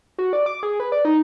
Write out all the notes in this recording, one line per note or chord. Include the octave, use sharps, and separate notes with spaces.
F#4
D5
D6
G#4
B4
D5
D#4